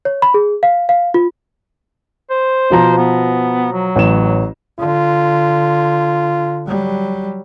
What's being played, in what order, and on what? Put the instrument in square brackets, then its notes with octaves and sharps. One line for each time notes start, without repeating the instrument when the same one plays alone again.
[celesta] C#5
B5
G#4
F5
F5
F4
[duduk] C5
[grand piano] B2 F3 A#5
[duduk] B3
F#3
[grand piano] A1 E7
[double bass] D3 [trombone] F4
[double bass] F#3 G3